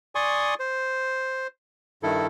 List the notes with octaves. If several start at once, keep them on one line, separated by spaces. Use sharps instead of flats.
D5 G#5 C6 C#6 D#6
C5
G2 D#3 E4 A4